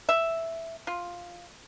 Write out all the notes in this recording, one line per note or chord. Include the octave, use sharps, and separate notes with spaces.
E5
F4